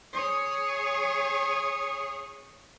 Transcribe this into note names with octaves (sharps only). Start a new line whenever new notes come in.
G#4 C#5